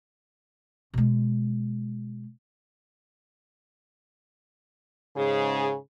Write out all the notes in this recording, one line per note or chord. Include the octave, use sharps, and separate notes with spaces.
B2 G#3
G#2 C#3 G#4